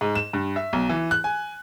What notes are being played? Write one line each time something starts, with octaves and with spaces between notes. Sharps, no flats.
G#2
E7
G2
E5
B1
E3
F#6
G#5